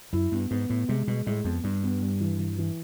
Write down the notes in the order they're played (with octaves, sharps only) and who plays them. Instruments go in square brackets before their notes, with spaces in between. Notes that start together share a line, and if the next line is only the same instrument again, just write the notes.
[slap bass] F#2 [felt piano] E4
[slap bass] G2 [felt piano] B3
[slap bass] G#2 [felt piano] B3
[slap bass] A2 [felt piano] B3
[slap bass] C3 [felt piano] G#3
[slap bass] B2 [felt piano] G#3
[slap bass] A2 [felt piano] G#3
[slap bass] F2 [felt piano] B3
[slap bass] G2 [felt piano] G3
[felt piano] B3
G3
E3
E3
E3